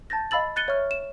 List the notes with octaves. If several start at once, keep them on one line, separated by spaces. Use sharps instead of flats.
A5 G6 A6 A#6
D#5 F5 B5 E6 A6 F#7
F#6 G#6 A6 C#7 D#7 G7
C#5 E5 C#6 F6
E7